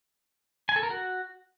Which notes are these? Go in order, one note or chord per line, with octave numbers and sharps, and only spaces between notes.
G#5
A4
A#4
F#4